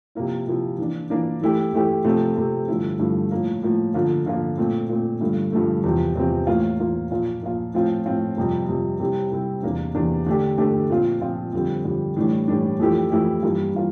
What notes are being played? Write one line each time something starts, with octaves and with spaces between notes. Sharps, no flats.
C3 F3 A#3 E4
C3 F3 A#3 E4
E3 A#3 D4
E3 A#3 D4
E3 A3 E4 G4
E3 A3 E4 G4
C3 F3 A3 C4
C3 F3 A3 C4
G2 D3 F3 A3 E4
G2 D3 F3 A3 E4
A2 F3 A#3
A2 F3 A#3
D3 F3 A#3 F4
D3 F3 A#3 F4
A#2 A3 C4
A#2 A3 C4
G2 D3 F3 A3
G2 D3 F3 A3
E2 C3 F3 C4
E2 C3 F3 C4
A2 E3 A#3 F4
A2 E3 A#3 F4
A#2 F3 A#3 F4
A#2 F3 A#3 F4
A2 F3 C4 F4
A2 F3 C4 F4
F2 C3 G3
F2 C3 G3
C3 G3 C4 E4
C3 G3 C4 E4
E2 C3 E3 A#3 D4
E2 C3 E3 A#3 D4
D3 A3 D4 G4
D3 A3 D4 G4
A#2 F3 C4 F4
A#2 F3 C4 F4
F2 D3 G3 C4
F2 D3 G3 C4
A2 E3 G3 D4
A2 E3 G3 D4
F2 E3 A3 E4 G4
F2 E3 A3 E4 G4
G2 E3 G3 A#3 F4
E3 G3 A#3 F4